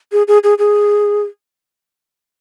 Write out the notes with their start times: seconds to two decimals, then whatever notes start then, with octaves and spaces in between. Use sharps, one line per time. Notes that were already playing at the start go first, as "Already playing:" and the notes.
0.12 G#4
0.28 G#4
0.44 G#4
0.59 G#4